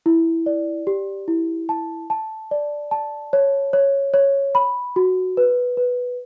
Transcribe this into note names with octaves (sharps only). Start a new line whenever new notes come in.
E4
D5
G4
E4
A5
A5
D5
A5
C#5
C#5
C#5
B5
F#4
B4
B4